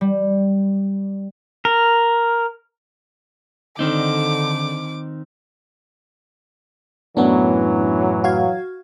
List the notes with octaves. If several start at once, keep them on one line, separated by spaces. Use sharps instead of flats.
G3
A#4
D3 D#3 C4 D#4 D6
F#2 A2 E3 F#3 B3 D4
F#4 F5 G#6